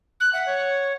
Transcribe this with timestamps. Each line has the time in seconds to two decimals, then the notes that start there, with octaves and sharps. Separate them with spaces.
0.20 F#6
0.33 E5 F#5
0.46 C#5